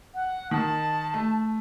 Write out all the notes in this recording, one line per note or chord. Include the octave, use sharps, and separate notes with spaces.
F#5
D#3 A5
A3